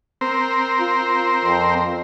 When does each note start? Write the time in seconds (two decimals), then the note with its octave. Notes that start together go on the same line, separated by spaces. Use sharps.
0.21 C4 A#4 C5
0.80 F4
1.45 F2